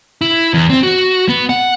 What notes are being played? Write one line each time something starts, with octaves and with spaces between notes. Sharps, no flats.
E4
E2
C4
F#4
B3
F#5